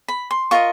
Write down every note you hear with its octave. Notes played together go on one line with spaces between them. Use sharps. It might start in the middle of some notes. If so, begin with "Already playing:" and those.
B5
C6
F4 A#4 D#5 C#6